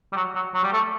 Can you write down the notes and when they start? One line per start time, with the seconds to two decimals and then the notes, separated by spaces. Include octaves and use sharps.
0.12 G3
0.16 F#3
0.35 F#3
0.54 F#3
0.63 G3
0.73 A3